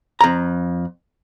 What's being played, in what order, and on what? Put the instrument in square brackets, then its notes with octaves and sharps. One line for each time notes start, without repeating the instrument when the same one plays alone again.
[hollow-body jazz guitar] F2 A#5